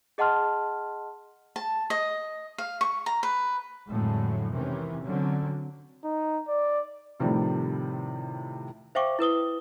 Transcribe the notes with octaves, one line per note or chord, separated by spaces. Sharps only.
G#4 D#5 F#5 A5 C6 F6
A5
D#5
F5
C#6
A#5
B4
F2 A2 D3 F#3 G#3 A3
C3 D#3 E3 C#4
D3 F#3 C4 C#4
D#4
D5
A2 C3 D#3 F3 G3 A3
C5 E5 F5 G5 C#6 D6
E4 B4 D#6 G7